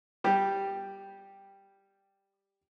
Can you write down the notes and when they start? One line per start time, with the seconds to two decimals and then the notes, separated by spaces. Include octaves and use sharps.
0.24 G3 G4